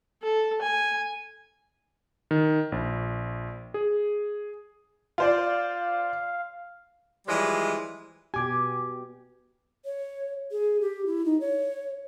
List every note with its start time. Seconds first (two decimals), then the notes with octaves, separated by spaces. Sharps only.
0.23 A4
0.62 G#5
2.31 D#3
2.72 A#1
3.74 G#4
5.18 F4 C5 D5 F5
7.27 E3 F3 G3 G#3
8.34 B2 G4 G#5 D6 G#6
9.85 C#5
10.51 G#4
10.81 G4
11.06 E4
11.25 D#4
11.41 C#5